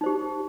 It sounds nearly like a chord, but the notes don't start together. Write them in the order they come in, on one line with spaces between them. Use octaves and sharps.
D#4 C5 G4